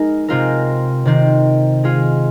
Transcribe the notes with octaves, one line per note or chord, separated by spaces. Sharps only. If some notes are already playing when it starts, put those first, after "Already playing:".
Already playing: G#3 D#4 A#4
C3 G#3 C4 F4 A#4
C3 D#3 C4
G#3 F4 G#4